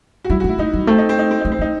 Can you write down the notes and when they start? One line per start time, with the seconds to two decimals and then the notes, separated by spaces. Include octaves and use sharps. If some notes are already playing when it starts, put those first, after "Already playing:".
0.25 F#4
0.30 G3 E4
0.40 F#4
0.44 A3 E4
0.58 A3 D#4
0.73 G3
0.87 A3 C4
0.98 D#4
1.09 C4
1.19 D#4
1.31 C4
1.41 A3 D#4
1.52 C4
1.59 A3 D#4